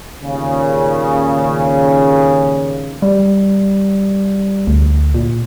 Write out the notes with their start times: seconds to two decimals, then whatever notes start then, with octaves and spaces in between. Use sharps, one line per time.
0.23 D#2 A#2 C#3
3.02 G3
4.67 D2
5.15 A#2